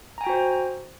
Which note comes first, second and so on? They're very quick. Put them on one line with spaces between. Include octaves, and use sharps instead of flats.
A#5 G#5 G5 F#4 C5